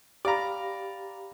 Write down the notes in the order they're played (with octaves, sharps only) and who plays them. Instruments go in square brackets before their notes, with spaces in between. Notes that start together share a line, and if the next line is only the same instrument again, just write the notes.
[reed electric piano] G4 F5 B5 [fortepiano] D5 A#5